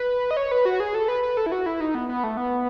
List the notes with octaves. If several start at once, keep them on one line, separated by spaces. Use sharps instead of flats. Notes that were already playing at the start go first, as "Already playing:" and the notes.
Already playing: B4
D#5
C#5
B4
F#4
G#4
A4
B4
B4
A4
E4
F#4
E4
D#4
B3
B3
A3
B3